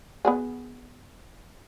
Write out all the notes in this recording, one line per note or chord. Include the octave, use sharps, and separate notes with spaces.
B3 F#4 G#4